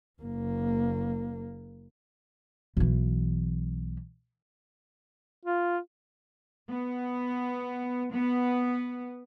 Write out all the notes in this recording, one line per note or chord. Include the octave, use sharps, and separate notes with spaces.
F#1 A#3
B1 E3
F4
B3
B3